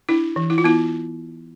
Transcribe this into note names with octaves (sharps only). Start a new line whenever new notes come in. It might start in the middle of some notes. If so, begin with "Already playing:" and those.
D4 E4
E3
E4
F4
B3 E4